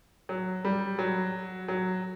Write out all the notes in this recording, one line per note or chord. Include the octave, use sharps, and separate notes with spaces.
F#3
G3
F#3
F#3